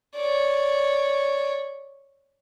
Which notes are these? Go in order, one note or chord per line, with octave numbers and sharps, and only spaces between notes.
C#5 D5